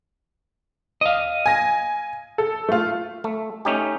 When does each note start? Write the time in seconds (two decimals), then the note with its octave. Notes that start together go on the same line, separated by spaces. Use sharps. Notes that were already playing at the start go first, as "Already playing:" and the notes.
1.01 D#5 F5
1.46 G#5 A#6
2.38 A4
2.69 A3 F4
3.24 A3
3.65 A3 C#4 D#4 G4